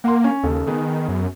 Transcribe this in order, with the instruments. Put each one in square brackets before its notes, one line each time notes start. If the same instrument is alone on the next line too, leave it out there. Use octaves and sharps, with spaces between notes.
[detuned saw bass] A#3 [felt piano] F#5 C6
[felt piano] C#4
[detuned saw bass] D#2 [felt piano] C#3 A4
[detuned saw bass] D#3 [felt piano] B3 G#4
[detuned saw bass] F#2